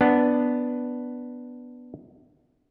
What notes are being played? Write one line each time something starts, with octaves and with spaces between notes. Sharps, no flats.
B3 D4